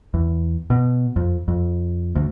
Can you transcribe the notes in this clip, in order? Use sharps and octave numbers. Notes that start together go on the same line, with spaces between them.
E2
B2
F2
F2
D2